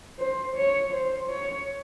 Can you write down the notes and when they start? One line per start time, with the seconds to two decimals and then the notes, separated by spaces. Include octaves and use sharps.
0.19 C5
0.56 C#5
0.93 C5
1.29 C#5